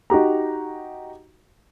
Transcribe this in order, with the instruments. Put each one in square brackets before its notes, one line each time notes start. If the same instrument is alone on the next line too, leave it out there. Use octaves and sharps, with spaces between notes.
[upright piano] D#4 F#4 G4 A#5